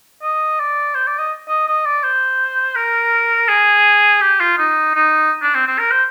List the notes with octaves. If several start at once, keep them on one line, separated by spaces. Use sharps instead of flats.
D#5
D5
C5
D5
D#5
D#5
D#5
D5
C5
A#4
G#4
G4
F4
D#4
D#4
D4
C4
C4
A#4
C5